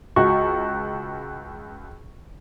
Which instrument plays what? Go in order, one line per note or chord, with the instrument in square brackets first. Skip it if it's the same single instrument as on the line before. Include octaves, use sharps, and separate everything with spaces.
[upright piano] C#2 F#4 [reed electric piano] C#6